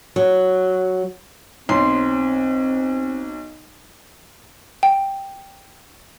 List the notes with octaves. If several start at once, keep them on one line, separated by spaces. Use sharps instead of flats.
F#3
B1 C4 C6
G5